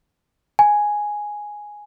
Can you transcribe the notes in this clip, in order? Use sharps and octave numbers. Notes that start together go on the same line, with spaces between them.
G#5